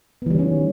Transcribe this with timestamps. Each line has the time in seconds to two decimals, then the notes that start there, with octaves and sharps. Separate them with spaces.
0.22 B3
0.26 E3
0.30 G3
0.35 D#3
0.39 C#4